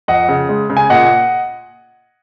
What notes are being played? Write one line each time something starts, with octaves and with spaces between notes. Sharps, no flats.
F2 D#5 F#5
C#3
G#3
C#3
G#5
A#2 D#5 F#5